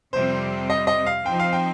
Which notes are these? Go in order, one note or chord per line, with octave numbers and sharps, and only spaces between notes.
F2 C3 G3 C4 C5
D#5
D#5
F5
F3 C4 D#4 C5 G5
F5
G5